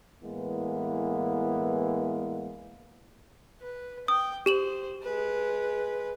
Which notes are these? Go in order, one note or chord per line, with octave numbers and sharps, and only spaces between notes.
A2 E3 G#3 A#3 B3
B4
G5 D#6
G4 C5 E7 F#7
G#3 B4